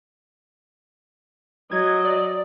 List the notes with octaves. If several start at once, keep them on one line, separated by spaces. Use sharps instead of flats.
F#3 D#5 G#6
D5